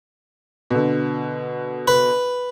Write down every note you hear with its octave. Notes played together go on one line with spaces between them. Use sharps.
B2 D3
B4